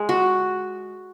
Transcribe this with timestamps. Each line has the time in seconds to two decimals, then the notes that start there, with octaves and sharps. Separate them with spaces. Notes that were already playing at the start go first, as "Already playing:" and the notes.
Already playing: G#3
0.09 F#4